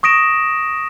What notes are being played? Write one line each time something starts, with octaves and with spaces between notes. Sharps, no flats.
C#6 D#6 A#6 D7 E7